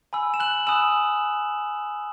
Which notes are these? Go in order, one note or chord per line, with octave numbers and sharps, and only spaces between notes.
G#5 B5 E6
E7
F#6 F#7
G#5 B5 D#6 E6 F#6 E7